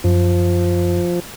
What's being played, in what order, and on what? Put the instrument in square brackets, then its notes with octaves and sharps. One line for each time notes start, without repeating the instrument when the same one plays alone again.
[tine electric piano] F#2 [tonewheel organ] F3